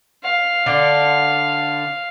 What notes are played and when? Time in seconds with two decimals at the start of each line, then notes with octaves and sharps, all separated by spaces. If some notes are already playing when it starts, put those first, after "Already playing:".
0.23 F5
0.66 D3 D4